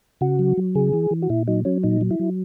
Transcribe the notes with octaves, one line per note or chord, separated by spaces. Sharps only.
C#3 F#4
F#3
F#3
C#3 G#4
E3
E3
F#4
A#2 E4
F#3 D#4
F#3 C#4
A#2 D#4
F#3
E4
F#3